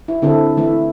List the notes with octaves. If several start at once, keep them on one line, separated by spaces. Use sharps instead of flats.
E4
D3 C4 E4 A4
E3 A3 E4 E5